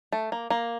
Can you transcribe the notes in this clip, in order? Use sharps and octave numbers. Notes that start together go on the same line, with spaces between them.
A3
A#3
A#3